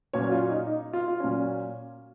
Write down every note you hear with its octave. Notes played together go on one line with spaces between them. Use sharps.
A#2 F#3 C#4 C#5
F#4
F4
D#4
D#4
F4
F4
A#2 F#3 C#4